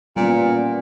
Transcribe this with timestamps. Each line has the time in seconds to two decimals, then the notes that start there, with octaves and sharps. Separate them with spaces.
0.17 A#2 G3 B3 C#4